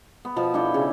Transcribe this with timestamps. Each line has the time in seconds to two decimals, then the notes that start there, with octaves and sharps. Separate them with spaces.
0.25 B3
0.36 B2 F3
0.54 D4 E4 A4 G5
0.74 C#3